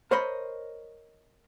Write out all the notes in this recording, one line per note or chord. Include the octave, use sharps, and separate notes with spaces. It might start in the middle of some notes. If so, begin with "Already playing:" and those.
A#4 C5 C#5 D#5 B5 C6